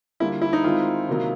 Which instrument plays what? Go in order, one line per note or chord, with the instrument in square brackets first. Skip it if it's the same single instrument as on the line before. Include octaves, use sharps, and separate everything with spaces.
[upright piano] D3 G3 A#3 D4 F4 [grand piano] E4
[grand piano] E4
D#4
[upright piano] D#3 G#3 C4 [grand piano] F4
[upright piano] C3 D#3 F#3 A#3